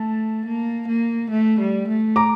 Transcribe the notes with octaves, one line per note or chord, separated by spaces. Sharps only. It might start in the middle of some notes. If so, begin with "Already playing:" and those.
Already playing: A3 A5
A#3
A#3
A3
G3
A3
A#5 D6